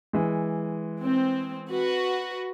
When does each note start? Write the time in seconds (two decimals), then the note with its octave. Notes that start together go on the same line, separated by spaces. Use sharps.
0.13 E3 G#3
1.03 C4
1.71 F#4 B4